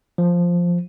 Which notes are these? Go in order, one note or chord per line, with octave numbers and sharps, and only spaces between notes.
F3